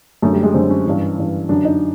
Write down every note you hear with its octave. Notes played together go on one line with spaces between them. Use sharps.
F#2 D3 A3
G3
G#3
F#2 D3 C4
C#4
G2 E3
G2 E3
F#2 D3 D4
D#4